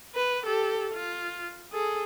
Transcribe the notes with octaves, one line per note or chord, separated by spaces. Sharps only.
B4
G4 A4
F4
G#4 A4